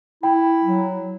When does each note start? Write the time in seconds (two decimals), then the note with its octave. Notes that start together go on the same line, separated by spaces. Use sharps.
0.23 E4 G5
0.63 F#3